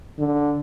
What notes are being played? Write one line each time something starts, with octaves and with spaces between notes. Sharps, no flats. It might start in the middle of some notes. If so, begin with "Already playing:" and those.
D3